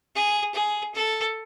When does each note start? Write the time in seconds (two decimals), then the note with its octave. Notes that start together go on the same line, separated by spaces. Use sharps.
0.15 G#4
0.55 G#4
0.94 A4